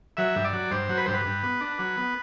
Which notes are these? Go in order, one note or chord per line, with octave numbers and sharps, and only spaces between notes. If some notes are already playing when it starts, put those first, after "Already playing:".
F#3 E5
G2
D5
F#3
G2 C5
F#3
B4
G2 C5
B4
G2
B3
D4
F#3
B3